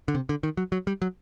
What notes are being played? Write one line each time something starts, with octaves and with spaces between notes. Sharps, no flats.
D3
C3
D3
D#3
F#3
F#3
G3
F#3